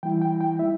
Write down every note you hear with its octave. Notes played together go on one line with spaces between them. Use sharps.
E3 G3 E4 G5
G5
G5
G3 E4 E5